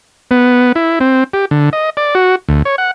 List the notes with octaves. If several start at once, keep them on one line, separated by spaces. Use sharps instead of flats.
B3
E4
C4
G4
D3
D#5
D5
F#4
D2
C#5
F#5